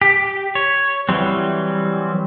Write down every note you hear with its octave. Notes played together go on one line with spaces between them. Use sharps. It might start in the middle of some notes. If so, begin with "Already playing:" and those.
G4
C#5
E3 F#3 G3 C4